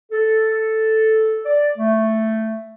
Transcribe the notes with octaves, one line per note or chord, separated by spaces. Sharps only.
A4
D5
A3